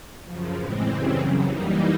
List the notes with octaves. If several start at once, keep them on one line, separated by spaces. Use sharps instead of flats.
F#2 C#3 F3
A2 E3 G#3 C4
F#2 C#3 E3 G3 C4
F#2 C#3 F#3
E3 G3 A#3 D#4